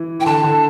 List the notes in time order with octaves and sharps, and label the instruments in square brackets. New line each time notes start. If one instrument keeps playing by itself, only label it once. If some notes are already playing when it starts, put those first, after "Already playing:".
Already playing: [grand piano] E3
[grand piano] E3 [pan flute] G5
[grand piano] D3 [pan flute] A5
[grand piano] D3